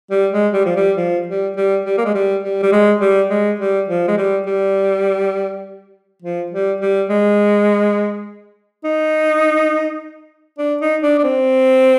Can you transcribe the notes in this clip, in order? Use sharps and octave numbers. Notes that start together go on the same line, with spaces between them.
G3
G#3
G3
F3
G3
F3
G3
G3
G3
A#3
G#3
G3
G3
G3
G#3
G3
G#3
G3
F3
G#3
G3
G3
F3
G3
G3
G#3
D#4
D4
D#4
D4
D4
C4